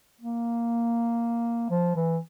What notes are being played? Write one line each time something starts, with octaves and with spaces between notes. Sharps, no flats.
A#3
F3
E3